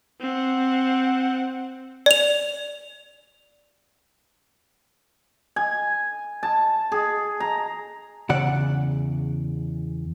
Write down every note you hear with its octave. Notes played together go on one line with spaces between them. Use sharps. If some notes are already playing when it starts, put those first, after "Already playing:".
C4 F#5
D5 F7
G#5
A5
G#4
A#5
E2 C#3 D5 F#5